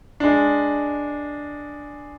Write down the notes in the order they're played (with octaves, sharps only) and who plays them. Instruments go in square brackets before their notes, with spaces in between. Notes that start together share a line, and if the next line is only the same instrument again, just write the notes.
[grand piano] G#3 D4